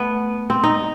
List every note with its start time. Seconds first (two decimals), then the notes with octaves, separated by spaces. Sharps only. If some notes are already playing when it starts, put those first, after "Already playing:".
Already playing: A3 B3
0.50 C4
0.64 D#4